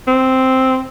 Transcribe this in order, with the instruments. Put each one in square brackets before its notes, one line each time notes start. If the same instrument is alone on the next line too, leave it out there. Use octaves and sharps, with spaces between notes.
[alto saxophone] C4